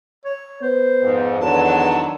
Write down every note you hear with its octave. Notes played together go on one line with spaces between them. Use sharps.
C#5
B3 C5
F2 G#2
E2 D3 D#3 F#3 B4 A5